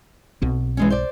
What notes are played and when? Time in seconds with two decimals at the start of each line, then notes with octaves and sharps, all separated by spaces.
0.42 B1 B2 C4
0.77 E3 G#3 C#4
0.90 C5 D5